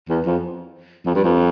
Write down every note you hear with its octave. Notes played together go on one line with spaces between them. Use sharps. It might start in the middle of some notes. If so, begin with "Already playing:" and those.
E2
F2
F2
G2
F2